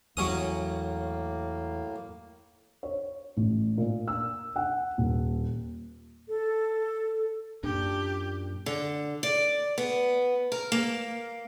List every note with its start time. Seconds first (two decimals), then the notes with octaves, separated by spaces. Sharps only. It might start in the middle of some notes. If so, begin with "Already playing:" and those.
0.17 E2 A2 F#3 A#3 C#4 D#6
2.83 C#5
3.37 A1
3.78 A#2
4.08 E6
4.56 F#5
4.98 D#1
6.29 A4
7.63 F#2 A#2 D4 G4
8.66 D3
9.23 D5
9.78 B3
10.52 A#4
10.72 A#3